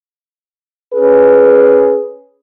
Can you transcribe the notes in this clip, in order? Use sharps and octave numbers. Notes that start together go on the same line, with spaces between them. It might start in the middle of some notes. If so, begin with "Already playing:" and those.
C#4 G#4 B4